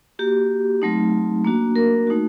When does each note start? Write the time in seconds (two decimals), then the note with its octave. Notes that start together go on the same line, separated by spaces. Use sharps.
0.19 A#3 F#4 G4
0.82 F#3 A3 C4 D#4
1.44 A#3 D4 F#4
1.76 A#4
2.07 A3 D#4 F#4